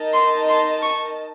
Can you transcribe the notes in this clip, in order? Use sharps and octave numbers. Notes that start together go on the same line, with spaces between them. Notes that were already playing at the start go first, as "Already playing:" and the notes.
Already playing: D#4 A#4 D#5 A5
C6
C6
C#6